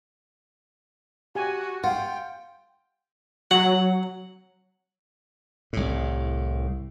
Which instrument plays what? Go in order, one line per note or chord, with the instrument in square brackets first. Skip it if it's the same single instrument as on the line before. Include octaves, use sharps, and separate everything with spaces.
[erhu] F#4 [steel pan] G4 G#5
[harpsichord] F4 [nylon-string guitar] F#5 [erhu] G5
[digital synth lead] F#3 [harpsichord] F#5
[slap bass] C2 A2